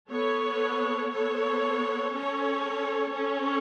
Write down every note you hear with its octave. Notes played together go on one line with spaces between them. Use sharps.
B3 A4 C#5
B3 A4 C#5
C#4 A4 C#5
C#4 A4 C#5